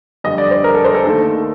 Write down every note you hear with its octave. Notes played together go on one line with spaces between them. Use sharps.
F2 D3 G3 D#5
D5
C5
A#4
A4
C5
A4
D#2 D#3 A3 A4